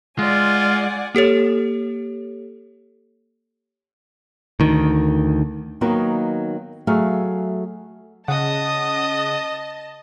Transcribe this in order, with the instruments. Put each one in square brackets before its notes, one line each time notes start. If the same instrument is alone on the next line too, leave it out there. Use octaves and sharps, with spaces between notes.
[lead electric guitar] G#3 [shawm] F4 [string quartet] D5 F#5 G#5
[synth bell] A#3 G4 A4 C#5
[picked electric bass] D2 D#3
[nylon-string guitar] D#3 F#3 A#3 B3 D#4 F#4
F#3 A3 G#4 E5 F5
[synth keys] C#3 F#5 [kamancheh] D#5 A5 [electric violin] D#6